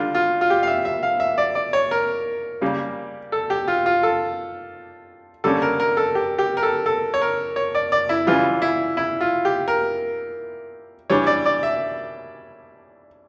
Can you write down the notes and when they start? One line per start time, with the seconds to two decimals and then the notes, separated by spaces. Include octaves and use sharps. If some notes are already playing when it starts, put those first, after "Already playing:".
Already playing: D3 G3 D4 F4
0.15 F4
0.41 F4
0.50 G4
0.63 F5
0.67 E5
0.85 E5
1.03 F5
1.20 E5
1.38 D5
1.55 D5
1.73 C#5
1.91 A#4
2.61 C#3 G3 A#3
3.32 A4
3.50 G4
3.68 F4
3.86 F4
4.03 A4
5.44 D3 G3 A#3 C#4 A4
5.62 A#4
5.80 A#4
5.97 A4
6.15 G4
6.38 G4
6.57 A#4
6.63 A4
6.86 A4
7.14 C#5
7.22 A#4
7.56 C#5
7.75 D5
7.92 D5
8.09 E4
8.27 C#3 E3 G3 F4
8.62 E4
8.97 E4
9.21 F4
9.45 G4
9.68 A#4
11.10 E3 G3 D4 C#5
11.27 D5
11.45 D5
11.63 E5